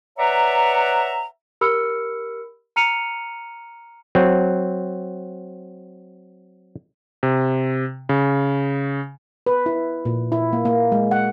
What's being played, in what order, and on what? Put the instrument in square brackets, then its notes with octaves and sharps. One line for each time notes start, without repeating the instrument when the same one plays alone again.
[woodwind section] B4 C#5 D5 E5 F#5 A#5
[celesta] G4 A#4 B5 E6 F6 C#7
A#5 F6 C#7 D#7 F7
[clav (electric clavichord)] F#3 C4
[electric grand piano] C3
C#3
[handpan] B4
E4
A#2
E4
A#3
A#3
G#3
F#5